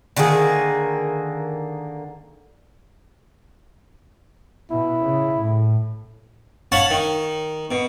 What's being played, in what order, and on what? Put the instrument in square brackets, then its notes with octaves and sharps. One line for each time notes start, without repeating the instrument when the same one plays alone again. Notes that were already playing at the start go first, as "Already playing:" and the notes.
[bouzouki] D3 D#3 A#3 G#4
[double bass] B2 [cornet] E4
[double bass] C#3
A2
[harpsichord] C#5 F5 F#5 A5 B5
D#3
B2